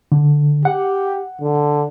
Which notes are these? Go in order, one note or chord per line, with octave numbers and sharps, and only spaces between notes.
D3
G4 F#5
D3